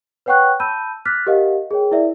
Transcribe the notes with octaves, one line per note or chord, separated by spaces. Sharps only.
B4 C#5 F#5 G5 C#6 F#6
A5 B5 E6 G6 D#7
D6 F6 F#6 A6 B6
G4 A#4 D#5 F5 F#5
G#4 A#4 C#5 G5
E4 A#4 D5 E5